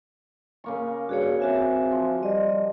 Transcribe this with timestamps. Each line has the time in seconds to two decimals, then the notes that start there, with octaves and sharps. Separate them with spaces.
0.64 C#3 A#3 C#6
1.09 G2 F#4 G#4 C#5
1.40 C4 F#4 E5 G#5
1.92 F3
2.23 G3 D#5